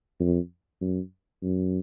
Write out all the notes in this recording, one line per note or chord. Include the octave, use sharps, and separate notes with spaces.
F2
F#2
F#2